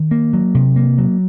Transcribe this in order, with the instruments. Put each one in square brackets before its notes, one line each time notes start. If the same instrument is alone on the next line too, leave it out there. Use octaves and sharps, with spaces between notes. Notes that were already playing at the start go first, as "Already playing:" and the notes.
Already playing: [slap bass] D#3
A#3
F#3
C3
A#3
F#3